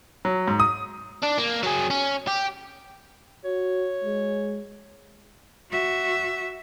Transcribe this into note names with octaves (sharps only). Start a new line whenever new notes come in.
F#3
G#2
D#6
D4
A#3
F#3 G#4
C#4
G4
F#4 C#5
G#3
F#4 E5